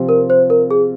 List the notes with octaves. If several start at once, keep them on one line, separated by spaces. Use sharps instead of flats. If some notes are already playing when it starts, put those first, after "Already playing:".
Already playing: C3 F3 C4 F4
A#4
C5
A#4
G#4